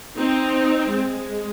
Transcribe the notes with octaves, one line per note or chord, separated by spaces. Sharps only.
C4 D#4
G#3